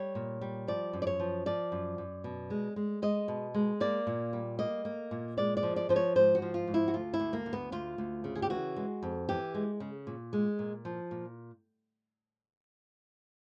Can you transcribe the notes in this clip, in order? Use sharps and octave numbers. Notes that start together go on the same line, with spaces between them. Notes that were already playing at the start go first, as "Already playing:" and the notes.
Already playing: G3 C#5
A#2
G3
F3 D5
F#2
D5
C#5
F3
F3 D5
F#2
F#2
B2
G#3
G#3
G#3 D#5
B2
G#3
A#3 D5
A#2
G3
A#3 D#5
A#3
A#2
G#3 D5
D5
F3
D5
F3 C5
C#5
G#2 C5
F#4
F3
F4
G#2
E4
F#4
D2 F4
E4
D2
A#3
D2
B3
D2 F4
D2
C#3
G#4
G4
E3 F#4
G#3
F2
E3 G4
G#3
C#3
A#2
G#3
A#2
F3
A#2